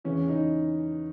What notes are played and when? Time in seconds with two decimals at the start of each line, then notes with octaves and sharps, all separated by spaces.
0.05 E2 C#3 E3 C#4
0.29 D#4